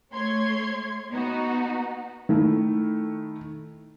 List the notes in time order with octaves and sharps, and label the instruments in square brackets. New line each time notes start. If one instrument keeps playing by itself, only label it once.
[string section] A3 C#5 C6 G#6
B3 D#4 F#4
[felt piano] D#3 A3 E4